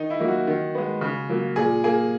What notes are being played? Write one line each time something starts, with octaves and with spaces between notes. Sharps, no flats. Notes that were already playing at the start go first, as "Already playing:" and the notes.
Already playing: D#3 D#4
E4
F#3 A#3
F#4
D#3
G#3 B3
C#3
F#3 A#3
A#2 G#4
A#3 G#4